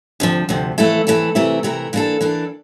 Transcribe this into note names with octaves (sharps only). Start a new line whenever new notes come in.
D2 C3 F3
D2 C3 F3
F2 E3 A3 E4 A4
F2 E3 A3 E4 A4
C3 E3 A3 E4 A#4
C3 E3 A3 E4 A#4
E3 A#3 D4 A4
E3 A#3 D4 A4